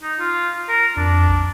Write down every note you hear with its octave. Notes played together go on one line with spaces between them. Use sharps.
D#4
F4
A#4
F2 D4
A#1